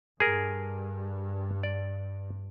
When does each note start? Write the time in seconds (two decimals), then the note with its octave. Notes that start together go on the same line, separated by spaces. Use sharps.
0.20 G2 G#4 A#4
1.63 D5